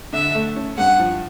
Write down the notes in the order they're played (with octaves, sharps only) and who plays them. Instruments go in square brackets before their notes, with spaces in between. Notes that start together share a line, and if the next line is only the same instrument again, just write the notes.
[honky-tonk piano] D3 [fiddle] E5
[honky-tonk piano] A3
C#4
[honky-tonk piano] G2 [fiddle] F#5
[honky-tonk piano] F3